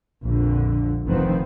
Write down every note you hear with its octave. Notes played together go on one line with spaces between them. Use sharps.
A#1 F2 A#2 D3
F1 F2 D#3 F3 B3 C4